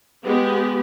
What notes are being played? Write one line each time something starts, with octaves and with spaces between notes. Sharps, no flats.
G#3 B3 G4